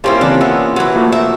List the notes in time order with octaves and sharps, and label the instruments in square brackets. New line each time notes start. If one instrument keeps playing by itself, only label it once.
[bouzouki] G3 C4 E4 [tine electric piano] A#3 C#4 F4
[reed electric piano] C#3 E3 C4 [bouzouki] D4
[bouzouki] B3 [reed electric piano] E5 C6 E6
[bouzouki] E3 F#3
[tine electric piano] F3 A3 [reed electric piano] A#3 F4 F#4
[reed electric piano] A#4 [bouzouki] E5